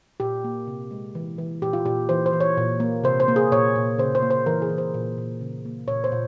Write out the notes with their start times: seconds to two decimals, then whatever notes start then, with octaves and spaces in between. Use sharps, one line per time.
0.20 A#2 G4
0.44 A#3
0.67 C3
0.91 G#3
1.15 E3
1.38 E3
1.62 A#2 G4
1.73 F4
1.85 A#2 G4
2.09 E3 C5
2.26 C5
2.33 E3
2.41 C#5
2.57 A#2
2.80 A#3
3.04 C3 C5
3.20 C5
3.28 A#3
3.36 G#4
3.52 A#2 C#5
3.76 A#2
3.98 C#3 C5
4.15 C5
4.22 A#3
4.31 C5
4.46 E3 A#4
4.62 G#4
4.70 E3
4.78 C5
4.94 A#2
5.18 A#2
5.41 C#3
5.65 A#3
5.88 A#2 C#5
6.04 C5
6.12 A#2